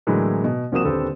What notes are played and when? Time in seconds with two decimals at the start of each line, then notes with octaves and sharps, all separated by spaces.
0.07 A2 D3 E3 F#3 G#3 A#3
0.44 B2
0.72 C2 F3 A#3 F#4 D#6 E7
0.84 D#1 D3 C4 G4 A4 B4